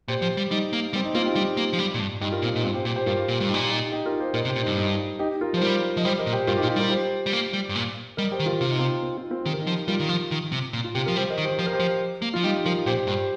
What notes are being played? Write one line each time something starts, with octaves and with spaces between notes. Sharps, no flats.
A#2 G4 C5
F3
G3
G3 D#4
A#3
G3 C4
D#4
A#3 C4 F4
D#4 G4
F4
G3 D#4 G4
A#3
F3
G3
A#2
G2
G2 D#4 G4
F4 A#4
A#2 C4
A#2 D#4
G2 C4 F4
G4 C5
A#2 G4 C5
G4 C5
G2 F4 A#4
A#2
G2
D#4 G4
A#2
D#4 G4
D#4 G4
F4 A#4
G4 C5
A#2 A#4 D#5
C3
G4 C5
A#2
D#4
G2
D#4
D#4 G4
F4 A#4
F3
C5
G3 F4 A#4
F3 D#5
G3 G4 C5
A#4 D#5
A#2
G4 C5
G2 F4 A#4
D#4 G4
A#2 F4
D#4 G4
G3 F4 A#4
G4 C5
G3
A#3
G3
G2
A#2
G3 A#4 D#5
G4 C5
D#3
F4 A#4
C3 F4
D#4
C4 F4
C4
C4 F4
C4 F4
D#3 G4
A#4
D#4 G4
F3
G3 F4 A#4
D#3
F3
D#3
C3
A#2
F4
C3 G4
F3 A#4
G3 G4 C5
A#4 D#5
D#3
G4 C5
F3 C5
A#4
G4 C5
F3
A#3
F3 F4
G3 D#4 G4
F3 F4 A#4
A#2 G4 C5
G2 G4 C5